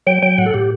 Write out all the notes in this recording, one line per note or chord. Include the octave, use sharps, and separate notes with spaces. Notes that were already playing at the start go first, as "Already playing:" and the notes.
F#3 G5
F#3 G5
A2 F#5
A4
A2 G4